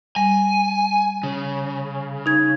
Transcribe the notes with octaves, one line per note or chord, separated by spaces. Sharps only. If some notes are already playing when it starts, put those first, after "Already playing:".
G3 G#5
C#3
D#4 G#6